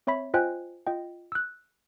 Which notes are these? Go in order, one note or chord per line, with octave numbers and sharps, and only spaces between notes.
C4 C#5 E5 B5 B6
F4 C5 D#5 G5 G#5 F#6
F4 D#5 G5
E6 F#6